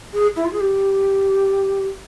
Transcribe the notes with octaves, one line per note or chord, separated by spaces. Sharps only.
G#4
E4
F4
G#4
G4